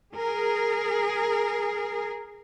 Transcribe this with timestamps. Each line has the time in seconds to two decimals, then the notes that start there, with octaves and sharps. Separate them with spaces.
0.15 G#4 A#4